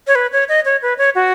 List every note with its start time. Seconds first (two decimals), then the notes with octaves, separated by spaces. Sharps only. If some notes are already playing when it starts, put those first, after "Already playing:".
0.07 C#5
0.15 B4
0.33 C#5
0.49 D#5
0.65 C#5
0.82 B4
0.98 C#5
1.15 F#4